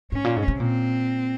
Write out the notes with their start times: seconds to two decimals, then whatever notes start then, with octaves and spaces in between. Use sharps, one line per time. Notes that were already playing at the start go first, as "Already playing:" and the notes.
0.12 G#2 C#4
0.24 A#2
0.36 G#2
0.48 C3
0.60 A#2 C4